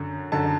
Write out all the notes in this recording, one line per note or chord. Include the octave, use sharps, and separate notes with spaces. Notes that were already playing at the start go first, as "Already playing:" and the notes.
Already playing: F#2 D3
F#2 D3 A5